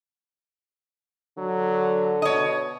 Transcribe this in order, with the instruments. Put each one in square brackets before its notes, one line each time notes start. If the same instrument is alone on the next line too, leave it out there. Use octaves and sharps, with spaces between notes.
[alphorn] D3 [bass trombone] F#3
[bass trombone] B2 [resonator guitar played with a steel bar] C#5 D#5